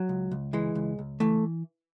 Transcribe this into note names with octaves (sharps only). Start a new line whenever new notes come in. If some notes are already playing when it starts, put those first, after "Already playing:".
Already playing: F#3
C#2
C#2
E3 G#3
C#2
C#2
E3 A3